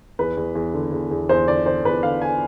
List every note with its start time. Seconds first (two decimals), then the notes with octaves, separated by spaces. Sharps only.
0.19 E2 B4
0.37 E2
0.55 E2
0.74 D3
0.92 E2
1.11 E2
1.29 E2 C5
1.48 D3 D5
1.66 D3 C5
1.85 E2 B4
2.03 D3 F5
2.22 G#5